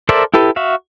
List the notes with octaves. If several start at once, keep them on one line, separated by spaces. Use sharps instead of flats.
A4 A#4 C5 D5 E5
E4 G4 A4 B4
F#4 E5 F5